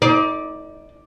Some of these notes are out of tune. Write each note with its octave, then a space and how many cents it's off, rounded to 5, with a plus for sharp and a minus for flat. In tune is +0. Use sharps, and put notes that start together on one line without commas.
D#4 +35 D5 +0